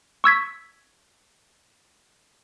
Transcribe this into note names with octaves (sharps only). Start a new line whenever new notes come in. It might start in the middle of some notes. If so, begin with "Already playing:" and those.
C#6 E6 G#6 B6